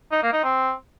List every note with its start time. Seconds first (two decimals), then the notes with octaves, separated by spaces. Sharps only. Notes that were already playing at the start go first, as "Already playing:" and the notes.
0.12 D#4
0.22 A#3
0.33 D#4
0.44 C4